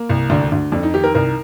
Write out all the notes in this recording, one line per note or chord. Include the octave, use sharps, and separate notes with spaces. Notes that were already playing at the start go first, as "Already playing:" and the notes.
Already playing: A#3
C2
D2 D4
D2
F2 D4
D#4
D#3 G4
A#4
C2 A#4